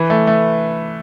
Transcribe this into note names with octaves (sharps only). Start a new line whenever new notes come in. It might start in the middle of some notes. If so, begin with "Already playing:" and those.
Already playing: E3 B4
A3
A3